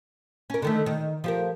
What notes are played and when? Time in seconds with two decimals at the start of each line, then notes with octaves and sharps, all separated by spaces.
0.50 C#4 A#4
0.62 D3 D#3 A3
0.86 D#3
1.24 F3 G4 A#4